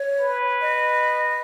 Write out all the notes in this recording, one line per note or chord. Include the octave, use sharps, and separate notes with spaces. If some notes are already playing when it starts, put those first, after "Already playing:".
Already playing: C#5
B4
D#5